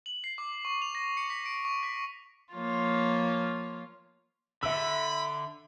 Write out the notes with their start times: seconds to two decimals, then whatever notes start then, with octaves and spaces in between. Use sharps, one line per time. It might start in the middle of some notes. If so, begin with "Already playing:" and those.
0.06 F#7
0.24 C7
0.38 D6
0.65 C#6
0.82 F7
0.95 A#6
1.17 C#7
1.30 B6
1.46 D7
1.65 C#6
1.83 B6
2.54 F3 A#3 F4 C#5
4.63 D3 E5 B5 E6